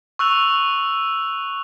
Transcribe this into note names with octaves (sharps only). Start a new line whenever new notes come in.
C#6 E6 F#6 F7